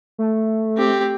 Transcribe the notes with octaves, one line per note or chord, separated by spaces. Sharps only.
A3
C4 G4